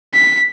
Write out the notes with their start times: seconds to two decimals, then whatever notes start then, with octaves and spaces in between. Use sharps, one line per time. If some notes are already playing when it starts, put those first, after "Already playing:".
0.14 B6